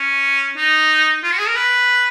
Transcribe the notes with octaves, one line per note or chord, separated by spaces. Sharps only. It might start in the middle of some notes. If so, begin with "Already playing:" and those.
Already playing: C#4
D#4
F4
F#4
G#4
A#4
B4